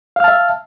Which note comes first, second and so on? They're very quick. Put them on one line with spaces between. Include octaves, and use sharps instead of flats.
F5 F6 A5 E5